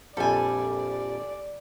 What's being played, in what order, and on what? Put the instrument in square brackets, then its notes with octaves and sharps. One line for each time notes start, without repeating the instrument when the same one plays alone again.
[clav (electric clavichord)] A#1 F2 G3 [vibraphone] G4 [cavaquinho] A4 G#5 [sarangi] D5